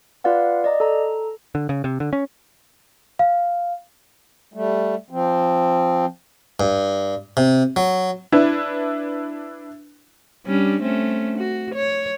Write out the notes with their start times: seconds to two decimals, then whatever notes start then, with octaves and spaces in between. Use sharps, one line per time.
0.24 F4 B4 D5 F5 F#5
0.64 D5 D#5 A#5
0.80 A4 A#5
1.55 D3
1.69 C#3
1.84 C3
2.00 D3
2.13 C#4
3.19 F5
4.54 G3 A3
5.10 F3 C4
6.60 G2
7.37 C3
7.76 F#3
8.32 D4 E4 B4
10.46 G3 C#4 D4
10.82 A3 C4 C#4
11.38 F#4
11.75 C#5